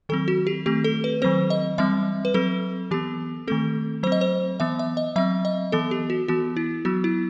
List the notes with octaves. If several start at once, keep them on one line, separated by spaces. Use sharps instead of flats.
D#3 F#3 C4 A4
F#4
G4
D#3 A3 C4 G4
A4
B4
D#3 F#3 C4 C5
D#5
E3 G3 C4 E5
B4
F#3 C4 A4
E3 B3 G4
D#3 A3 C4 A4
F#3 C4 C5
D#5
C5
E3 B3 E5
E5
D#5
F#3 C4 E5
D#5
E3 B3 A4
G4
F#4
E3 B3 F#4
E4
F#3 B3 F#4
E4